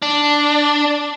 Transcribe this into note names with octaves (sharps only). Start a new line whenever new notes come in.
D4